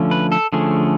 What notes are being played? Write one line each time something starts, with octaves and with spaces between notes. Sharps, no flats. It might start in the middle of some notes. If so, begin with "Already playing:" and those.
Already playing: D3 F3 A3 C#4
B4
A4
D3 F3 A3 C#4 G#4